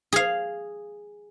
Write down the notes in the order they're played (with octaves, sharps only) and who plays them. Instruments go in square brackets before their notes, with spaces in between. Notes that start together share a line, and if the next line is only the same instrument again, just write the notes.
[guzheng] G#4 F5